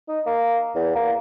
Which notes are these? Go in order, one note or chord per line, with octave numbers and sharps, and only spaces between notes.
D#4
A#3
E2
A#3